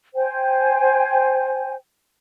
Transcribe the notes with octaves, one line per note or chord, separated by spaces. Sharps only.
C5 G5 G#5